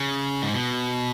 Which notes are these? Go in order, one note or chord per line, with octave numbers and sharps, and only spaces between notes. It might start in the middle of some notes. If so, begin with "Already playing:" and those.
Already playing: C#3
G#2
B2